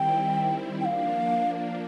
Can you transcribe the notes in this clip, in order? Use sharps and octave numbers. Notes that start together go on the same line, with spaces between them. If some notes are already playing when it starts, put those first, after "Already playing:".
Already playing: D#3 G3 C4 E4 G5
F3 A#3 D4 F5 G5